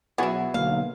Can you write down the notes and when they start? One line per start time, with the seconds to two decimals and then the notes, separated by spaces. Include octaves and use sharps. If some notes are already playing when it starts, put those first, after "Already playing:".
0.18 B2 F#3 B3 E4 F#4 G#4
0.54 B1 D3 A#3 F5